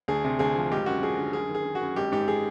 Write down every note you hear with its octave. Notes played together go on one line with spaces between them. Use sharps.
D2 G#4
C3
D2 G#4
F3
G#1 G4
F#2 F#4
F3 G#4
D3
F#2 G#4
D#3
G#4
D#3
F#4
F#2
G#1 G4
G#2 G4
G#4